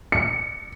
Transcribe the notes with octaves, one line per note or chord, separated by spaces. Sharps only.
C#7